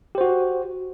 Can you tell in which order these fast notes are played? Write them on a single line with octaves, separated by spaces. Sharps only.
G4 C5 F#4